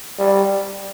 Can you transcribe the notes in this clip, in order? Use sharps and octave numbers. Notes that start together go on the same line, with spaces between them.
G3